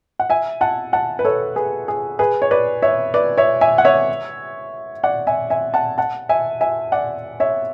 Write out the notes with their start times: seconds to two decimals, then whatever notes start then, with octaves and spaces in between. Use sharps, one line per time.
0.19 F#5
0.30 E5 G#5
0.61 F#5 A5
0.93 F#5 A5
1.19 B4
1.25 A4 C#5
1.56 G#4 B4
1.88 G#4
2.19 G#4 B4
2.42 C#5
2.51 B4 D5
2.82 C#5 E5
3.14 B4 D5
3.38 C#5 E5
3.61 E5 G#5
3.78 F#5
3.85 C#5 E5
5.04 D5 F#5
5.27 E5 G#5
5.50 E5 G#5
5.74 F#5 A5
5.98 F#5 A5
6.29 E5 G#5
6.61 E5 G#5
6.92 D5 F#5
7.40 C#5 E5